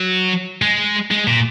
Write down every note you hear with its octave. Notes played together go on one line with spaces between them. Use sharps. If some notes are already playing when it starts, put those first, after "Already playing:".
Already playing: F#3
G#3
G#3
A#2